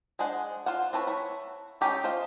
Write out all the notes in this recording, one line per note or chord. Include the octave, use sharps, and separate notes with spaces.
G#3 D4 G#4 C5 F#5
F4 C5 F5 F#5
C4 E4 A4 B4 C#5
E4 C#5
G#3 C#4 D#4 G4 A4
F4 C5 D#5 F5